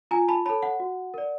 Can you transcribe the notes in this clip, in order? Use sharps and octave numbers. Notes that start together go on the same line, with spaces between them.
F4 G#5 A#5
A5 B5
A4 C#5 A5 B5
F#5
F#4
A#4 D5